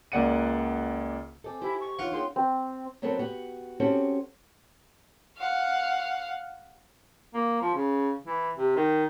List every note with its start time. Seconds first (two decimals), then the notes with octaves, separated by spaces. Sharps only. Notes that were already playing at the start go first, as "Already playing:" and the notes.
0.12 C#2 A#3 D5 F#5 C#7 D#7
1.44 C4 A4 D#5 G#5 D6
1.62 E4 G4 C5
1.80 C#6
1.99 E3 D4 D#4 F4 C#5 F5 F#5
2.12 A#3 D4 G#4 C#5 G5 C6
2.36 C4
3.02 F#3 B3 C4 F#4 A4 A#4
3.19 B3 F#4 G4
3.80 C4 C#4 F#4 G4 A4
5.38 F5 F#5
7.34 A#3
7.61 F3
7.74 C#3
8.27 E3
8.57 C3
8.77 D#3